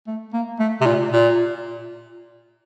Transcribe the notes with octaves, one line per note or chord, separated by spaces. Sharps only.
A3
A#3
A3
C3
A#2
A#2